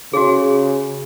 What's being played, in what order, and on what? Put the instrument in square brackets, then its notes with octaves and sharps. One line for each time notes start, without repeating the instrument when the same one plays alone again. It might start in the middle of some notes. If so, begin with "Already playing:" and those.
[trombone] C#3 [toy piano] F#4 G#4